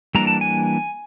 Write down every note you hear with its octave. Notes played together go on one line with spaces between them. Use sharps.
E3 G3 A#3 D4 A#5
A5
G#5